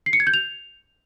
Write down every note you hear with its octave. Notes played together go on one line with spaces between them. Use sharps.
C7
C#7
G#6
G6
F7